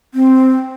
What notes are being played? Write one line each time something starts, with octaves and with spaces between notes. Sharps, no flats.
C4